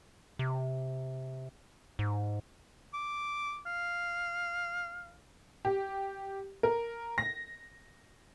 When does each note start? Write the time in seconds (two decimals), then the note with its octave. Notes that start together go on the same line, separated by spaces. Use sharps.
0.39 C3
1.99 G#2
2.94 D6
3.66 F5
5.65 G4
6.63 A#4
7.18 A#6